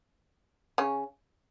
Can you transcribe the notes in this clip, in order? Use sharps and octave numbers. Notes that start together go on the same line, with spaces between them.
C#3 C#4